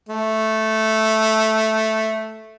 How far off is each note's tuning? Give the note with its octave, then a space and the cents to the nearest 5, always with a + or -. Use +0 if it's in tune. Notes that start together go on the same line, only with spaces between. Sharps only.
A3 -5